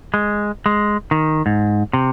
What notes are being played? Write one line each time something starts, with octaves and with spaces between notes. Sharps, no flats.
G#3
G#3
D#3
G#2
C3